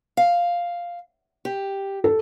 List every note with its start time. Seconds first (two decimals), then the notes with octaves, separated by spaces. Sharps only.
0.17 F5
1.45 G4
2.04 A4